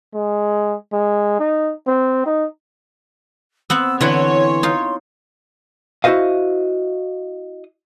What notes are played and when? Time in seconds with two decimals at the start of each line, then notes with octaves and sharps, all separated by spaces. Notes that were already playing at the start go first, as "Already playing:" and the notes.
0.15 G#3
0.93 G#3
1.40 D#4
1.88 C4
2.26 D#4
3.70 B3 C4 F#5 E6
4.01 D3 E3 E4 C#5 F#5 C6
4.63 D#4 F4
6.04 E4 F#4 A4 C5 D#5 F5